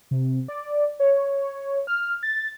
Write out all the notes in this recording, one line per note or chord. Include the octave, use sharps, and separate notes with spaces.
C3
D5
C#5
F6
A6